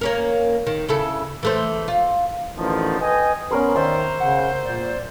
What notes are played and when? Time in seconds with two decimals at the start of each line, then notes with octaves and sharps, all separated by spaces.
0.01 A#3 C#4 A#4
0.66 D#3
0.89 C#3 E4 A4
1.43 E3 A3 C5
1.88 F4
2.58 A1 D3 D#3 F3
3.01 B4 D#5 G5 G#5
3.51 B3 C#4 A#4 C5 B5
3.76 D#3 C5 D5 E5 C6
4.00 A#5
4.20 C#3 F#5
4.39 G6
4.65 A#2 D5